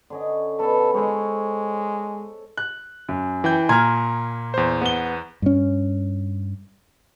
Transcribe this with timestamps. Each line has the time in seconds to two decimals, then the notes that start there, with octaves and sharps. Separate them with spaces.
0.10 D3 C#4 D#5
0.59 B2 A4 B4
0.94 G#3 A4 C5 C#5
2.57 F#6
3.09 F#2
3.44 E3 G5 G6
3.69 A#2 G#5 A#5 F6 G#6
4.54 E2 C5
4.81 B3 G7
5.42 G2 C#4